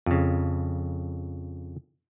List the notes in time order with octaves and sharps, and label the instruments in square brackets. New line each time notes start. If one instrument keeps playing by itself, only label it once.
[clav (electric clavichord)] F2 C#3